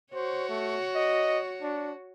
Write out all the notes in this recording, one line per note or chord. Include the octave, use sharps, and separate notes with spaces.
F#4 C5 C#5
A3
D#5
D4